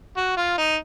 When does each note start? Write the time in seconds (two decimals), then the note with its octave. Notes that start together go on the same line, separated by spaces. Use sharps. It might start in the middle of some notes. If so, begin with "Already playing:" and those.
0.17 F#4
0.37 F4
0.58 D#4